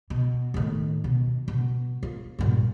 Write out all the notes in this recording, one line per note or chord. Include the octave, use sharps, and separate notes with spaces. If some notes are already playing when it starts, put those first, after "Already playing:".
B2
A2 D#3
B2
B2
F4
G2 A#2